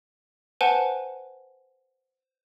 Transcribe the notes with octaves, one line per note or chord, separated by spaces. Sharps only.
B4 C5 F#5 G#5 A5